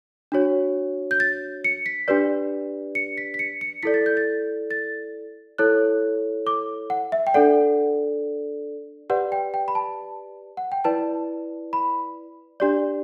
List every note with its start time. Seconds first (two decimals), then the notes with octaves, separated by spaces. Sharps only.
0.32 D4 F#4 C#5
1.11 G6
1.20 A6
1.64 C#7
1.86 B6
2.08 D4 G4 B4 D5
2.95 C#7
3.18 B6
3.34 B6
3.39 C#7
3.61 C#7
3.83 E4 A4 D5 B6
3.94 A6
4.06 G6
4.17 A6
4.71 A6
5.58 E4 A4 C#5 F#6
6.47 D6
6.90 F#5
7.12 E5
7.27 G5
7.34 D4 A4 D5 F#5
9.10 G4 B4 D5 F#5
9.32 G5
9.54 G5
9.68 B5
9.75 A5
10.57 F#5
10.72 G5
10.84 E4 B4 D5 A5
11.73 B5
12.60 D4 G4 D5